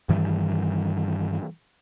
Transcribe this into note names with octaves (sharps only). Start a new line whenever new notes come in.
G2 D#3 E3 G3